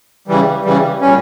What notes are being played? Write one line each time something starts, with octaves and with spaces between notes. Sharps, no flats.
C#3 E3 G3
C#3 E3 G3
A#2 G3 C#4